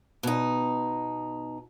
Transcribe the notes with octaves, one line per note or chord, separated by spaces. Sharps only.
B2 D#4